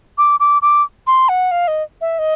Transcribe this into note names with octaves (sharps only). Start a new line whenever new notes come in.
D6
D6
D6
C6
F#5
F5
D#5
E5
D#5